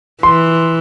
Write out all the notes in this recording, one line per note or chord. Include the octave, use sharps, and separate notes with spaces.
E3 C6